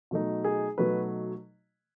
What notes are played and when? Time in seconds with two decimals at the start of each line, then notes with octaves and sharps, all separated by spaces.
0.11 B2 F#3 A3 D#4
0.44 G#4
0.78 B2 F#3 A3 D#4 B4